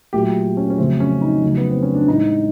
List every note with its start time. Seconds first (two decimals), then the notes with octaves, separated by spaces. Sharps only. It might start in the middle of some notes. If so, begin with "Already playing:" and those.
0.13 A#2 F#3 A3 G4
0.57 C#4
0.70 C#4
0.78 F2 C#3 F#3 A3 C4
1.00 C#4
1.21 D#4
1.42 F2 C#3 F#3 A3
1.57 B3
1.70 C4
1.83 C#4
1.95 D4
2.07 A2 E3 G#3 D#4